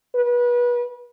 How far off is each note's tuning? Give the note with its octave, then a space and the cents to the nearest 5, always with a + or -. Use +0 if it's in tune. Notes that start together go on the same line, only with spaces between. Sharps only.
B4 -30